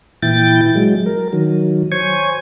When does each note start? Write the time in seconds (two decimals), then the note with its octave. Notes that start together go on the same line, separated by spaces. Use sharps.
0.22 A#2 E3 E4 G5 A6
0.75 F#3 G#3
1.06 A#4
1.33 D#3 F#3
1.92 C5 C#5 G#5 C#6